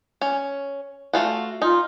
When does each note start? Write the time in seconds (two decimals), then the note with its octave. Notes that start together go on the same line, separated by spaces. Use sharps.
0.21 C#4
1.13 A3 F4 F#4
1.62 D#4 F4